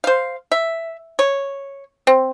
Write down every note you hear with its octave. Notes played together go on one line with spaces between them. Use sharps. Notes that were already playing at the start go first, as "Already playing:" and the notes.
C5 F5
E5
C#5
C4